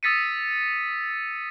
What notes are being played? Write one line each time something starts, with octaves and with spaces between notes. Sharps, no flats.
D#6 E6 A6 B6 C#7 D#7